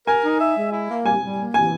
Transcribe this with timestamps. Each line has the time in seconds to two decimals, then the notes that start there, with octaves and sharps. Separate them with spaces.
0.07 A#4 G#5
0.23 D#4
0.40 E5
0.56 G#3
0.72 E4
0.89 A#3
1.05 G3 G#5
1.22 G3
1.38 A#3
1.54 E3 G#5